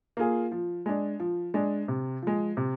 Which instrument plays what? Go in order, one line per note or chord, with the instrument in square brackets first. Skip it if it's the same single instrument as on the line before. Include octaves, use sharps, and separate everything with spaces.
[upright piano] A#3 F4 G#4
F3
G#3 D4
F3
G#3 D4
C3
F3 G#3
C3